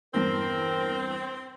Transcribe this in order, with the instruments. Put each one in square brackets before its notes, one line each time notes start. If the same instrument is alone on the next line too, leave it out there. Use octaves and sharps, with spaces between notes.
[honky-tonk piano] E2 G2 [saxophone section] C4 [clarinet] A#4